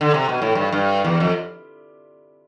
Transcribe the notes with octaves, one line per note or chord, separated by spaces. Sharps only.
D3
C3
B2
A2
G2
G2
E2
F2